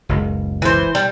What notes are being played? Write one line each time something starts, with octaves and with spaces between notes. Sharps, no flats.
F#1 C#2 F#2
E3 C5
G3